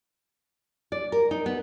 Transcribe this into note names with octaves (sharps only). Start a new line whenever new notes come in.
D5
A#4
D#4
B3